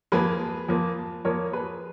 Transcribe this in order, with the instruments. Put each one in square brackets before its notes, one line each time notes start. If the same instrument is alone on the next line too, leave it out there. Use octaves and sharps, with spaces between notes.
[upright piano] F2 F3 A#3 G#4 B4
F2 F3 A#3
F2 F3 A#3 A#4 C#5
G#4 B4